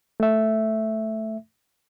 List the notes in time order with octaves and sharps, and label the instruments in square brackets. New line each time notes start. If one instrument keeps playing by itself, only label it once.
[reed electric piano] A3 E5